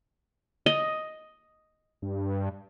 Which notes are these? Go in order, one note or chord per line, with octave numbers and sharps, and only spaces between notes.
D#5
G2